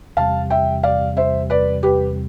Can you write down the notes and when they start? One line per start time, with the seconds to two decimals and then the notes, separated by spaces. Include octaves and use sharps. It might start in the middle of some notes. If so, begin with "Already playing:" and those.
0.17 E2 C3 G3 F5 A5
0.50 E5 G5
0.83 D5 F5
1.17 C5 E5
1.50 B4 D5
1.83 G4 B4